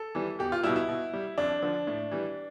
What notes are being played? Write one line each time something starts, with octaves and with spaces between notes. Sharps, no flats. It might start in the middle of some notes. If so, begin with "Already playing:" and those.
Already playing: A4
E3 G3
E2 G4
F4
B2 G3 E4
E4
B2
G3
F2 D4
D3 F3
A2
E3 G3